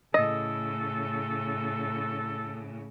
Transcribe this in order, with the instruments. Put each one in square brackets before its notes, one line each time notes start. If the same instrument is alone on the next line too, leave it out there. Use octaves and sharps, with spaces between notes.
[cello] A2 C#3 [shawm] A4 [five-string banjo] D#5